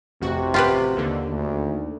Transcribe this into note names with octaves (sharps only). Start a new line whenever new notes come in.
A1 F2 C3 F#4
F4 G4 B4
D#2 D3
D2